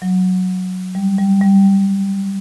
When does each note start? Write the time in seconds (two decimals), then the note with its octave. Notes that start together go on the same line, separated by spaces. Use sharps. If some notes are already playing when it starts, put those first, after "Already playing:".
0.02 F#3
0.95 G3
1.18 G3
1.41 G3